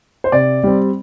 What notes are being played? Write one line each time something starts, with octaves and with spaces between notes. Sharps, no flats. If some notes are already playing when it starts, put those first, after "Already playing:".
C5
C3 D5
G3 C4